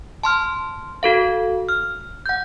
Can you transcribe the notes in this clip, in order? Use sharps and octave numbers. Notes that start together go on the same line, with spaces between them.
A5 C6 F6
F#4 A4 F5
F6
F#5 G6